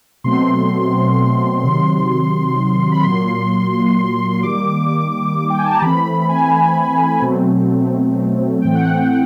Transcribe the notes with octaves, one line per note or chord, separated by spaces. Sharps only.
B2 F#3 A3 C4 C6
C3 D#3 F#3 C6
B5
A#2 F#3 A#3 C6
D#3 G3 A#3 D6
G5
G#5
A5
A#5
E3 A3 C4 B5
G#5
B2 F#3 A3 C4
A2 E3 A3 C4 G5
F#5
G5